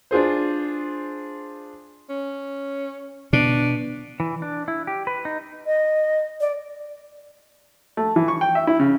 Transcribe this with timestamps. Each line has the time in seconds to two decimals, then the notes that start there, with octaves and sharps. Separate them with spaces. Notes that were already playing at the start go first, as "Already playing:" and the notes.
0.11 D4 F4 G#4 C5
2.10 C#4
3.33 B2 D4
4.20 E3
4.42 D4
4.68 E4
4.87 G4
5.07 B4
5.25 D#4
5.66 D#5
6.41 D5
7.97 A3
8.16 E3
8.28 C#6
8.41 G5
8.55 E5
8.67 E4
8.80 C#3